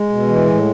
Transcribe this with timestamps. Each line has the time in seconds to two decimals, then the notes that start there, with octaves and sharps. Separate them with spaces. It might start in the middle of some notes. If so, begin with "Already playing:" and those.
Already playing: G#3
0.10 B2
0.28 E3
0.45 A2